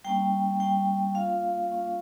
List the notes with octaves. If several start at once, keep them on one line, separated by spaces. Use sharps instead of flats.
G3 A#3 C#4 G5
G3 A#3 C#4 G5
A#3 C#4 F4 F5
A#3 C#4 F4